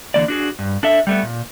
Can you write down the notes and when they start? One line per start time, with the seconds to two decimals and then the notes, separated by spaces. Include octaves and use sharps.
0.14 D3 E3 A#3 D5
0.28 D4 F#4 G#4
0.59 G2
0.83 D4 A4 E5
1.07 G3 A3 B3
1.23 A#2